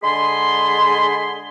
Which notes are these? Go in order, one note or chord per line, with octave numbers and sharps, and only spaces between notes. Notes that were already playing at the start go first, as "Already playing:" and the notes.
D3 G#3 G#4 B5 C6